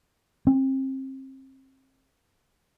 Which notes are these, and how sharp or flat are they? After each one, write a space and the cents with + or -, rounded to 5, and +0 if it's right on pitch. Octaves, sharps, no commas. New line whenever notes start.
C4 +30